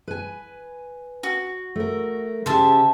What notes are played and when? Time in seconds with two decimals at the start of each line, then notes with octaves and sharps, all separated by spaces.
0.08 B4 G#5
1.23 F#4
1.76 A3 A#4
2.46 C#3 G4 C5 E5 A5